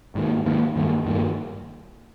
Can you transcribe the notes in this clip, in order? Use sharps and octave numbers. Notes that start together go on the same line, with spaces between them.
G#2 D#3 A#3
G#2 D#3 A#3
G2 D#3 A#3
G2 D#3 A#3